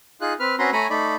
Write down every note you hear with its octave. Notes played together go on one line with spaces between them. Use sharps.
D#4 F4 G#4 F#6
C4 B4 F6
C4 C#4 F#4 B4 A#5 C6
A3 C#5 G#5 A#5 B5
A3 D#4 D5 B5